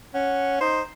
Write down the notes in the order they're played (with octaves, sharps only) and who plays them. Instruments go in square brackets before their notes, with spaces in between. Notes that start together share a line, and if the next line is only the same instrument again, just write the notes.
[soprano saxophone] C#4 [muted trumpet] F#5
[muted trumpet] D#4 [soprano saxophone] C5